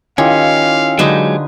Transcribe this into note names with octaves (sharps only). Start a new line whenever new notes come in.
D#3 C#4 E4 F4 G4 F5
D3 F#3 G#3 D#4 G4 B4 G#5 D#6